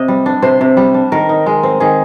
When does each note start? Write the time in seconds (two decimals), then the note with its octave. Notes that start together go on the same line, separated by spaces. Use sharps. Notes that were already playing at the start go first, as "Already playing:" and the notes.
Already playing: C3 D#5
0.08 G3
0.26 D4
0.42 C3 C5
0.61 C3
0.77 G3
0.94 D4
1.12 D#3 A#4
1.29 D#4
1.46 G#3
1.63 C4
1.80 D#3 G#4